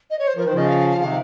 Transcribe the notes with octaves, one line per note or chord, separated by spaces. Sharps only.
D#5
C#5
C5
F3 A#4
D#3 C5
C#3 F3 D#5
F5
F5
F5
C#3
C3 D#3 F5